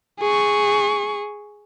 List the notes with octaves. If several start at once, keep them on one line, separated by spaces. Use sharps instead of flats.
G#4 C#6